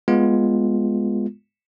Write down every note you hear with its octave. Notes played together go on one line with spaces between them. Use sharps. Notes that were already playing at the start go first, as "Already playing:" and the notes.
G#3 B3 F4